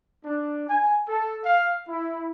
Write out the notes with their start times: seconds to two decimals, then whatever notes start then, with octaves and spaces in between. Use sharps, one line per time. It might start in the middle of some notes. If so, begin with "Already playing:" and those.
0.25 D4
0.68 G#5
1.07 A4
1.45 F5
1.88 E4